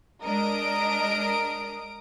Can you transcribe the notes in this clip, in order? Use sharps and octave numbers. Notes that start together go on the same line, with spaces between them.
G#3 D4 A#4 D#5 D#6 D7